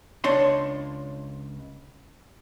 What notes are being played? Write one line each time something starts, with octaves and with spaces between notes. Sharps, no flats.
C#2 D4 C#5 A5 C6